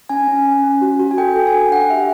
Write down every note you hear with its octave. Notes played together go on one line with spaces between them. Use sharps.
C#4 G#5
C#4
C#4
C#4
F#4
F#4
G#5
A4 G5
A4
G#5
D4 G5
D4 F#5
G4 E5